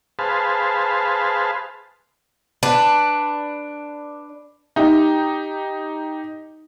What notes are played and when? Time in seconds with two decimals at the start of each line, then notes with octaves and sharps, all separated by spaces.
0.19 G#4 B4 C5 F5 A5
2.63 D4 B4
4.76 D#4 G4